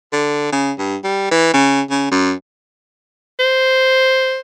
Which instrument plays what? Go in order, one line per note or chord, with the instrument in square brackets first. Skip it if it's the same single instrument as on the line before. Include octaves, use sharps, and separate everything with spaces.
[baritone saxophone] D3
C#3
G2
G3
E3
C#3
C#3
F#2
[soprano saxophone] C5